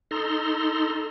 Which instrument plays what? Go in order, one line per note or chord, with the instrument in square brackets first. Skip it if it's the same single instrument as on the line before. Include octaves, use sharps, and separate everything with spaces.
[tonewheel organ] D#4 A4 A#5 C6